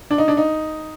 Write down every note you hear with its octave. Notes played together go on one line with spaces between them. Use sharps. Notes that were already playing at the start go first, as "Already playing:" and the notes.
D4
D#4
D4
D#4